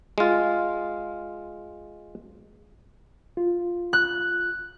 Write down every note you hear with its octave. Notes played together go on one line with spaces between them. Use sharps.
G#3 F4
F4
F#6